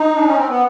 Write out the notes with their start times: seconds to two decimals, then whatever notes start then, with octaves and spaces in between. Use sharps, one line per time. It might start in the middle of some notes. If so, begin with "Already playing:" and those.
Already playing: D#4
0.16 D4
0.27 C#4
0.37 C4
0.48 B3